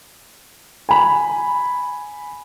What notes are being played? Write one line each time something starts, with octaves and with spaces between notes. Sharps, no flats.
G#5 B5